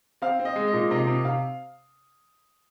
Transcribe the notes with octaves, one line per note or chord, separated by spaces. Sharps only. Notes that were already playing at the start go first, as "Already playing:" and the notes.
C4 F5
C4
D#5
G#3
D#5
A#2
C3 D#5
C3
C3 F5